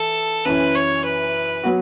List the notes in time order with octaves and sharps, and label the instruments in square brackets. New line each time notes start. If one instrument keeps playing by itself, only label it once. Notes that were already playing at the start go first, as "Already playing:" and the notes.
Already playing: [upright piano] E3 [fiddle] A4
[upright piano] F#2 E3 C#4 E4 [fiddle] B4
[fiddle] C#5
B4
[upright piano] F#3 B3 F#4